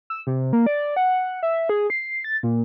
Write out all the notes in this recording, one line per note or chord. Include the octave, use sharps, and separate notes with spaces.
E6
C3
A#3
D5
F#5
E5
G#4
C7
A6
A#2